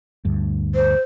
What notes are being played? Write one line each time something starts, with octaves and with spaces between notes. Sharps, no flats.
D2 G2
C5